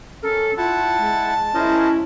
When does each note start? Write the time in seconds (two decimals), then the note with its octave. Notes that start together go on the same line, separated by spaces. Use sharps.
0.23 C#4 A4 A#4
0.57 E4 F4 F#5 A5
0.98 G#3
1.55 C#4 E4 A#4 C5 D#5